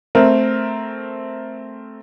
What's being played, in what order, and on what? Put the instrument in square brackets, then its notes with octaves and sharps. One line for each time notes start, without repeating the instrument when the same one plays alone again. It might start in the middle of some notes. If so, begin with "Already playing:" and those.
[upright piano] A3 C4 A#4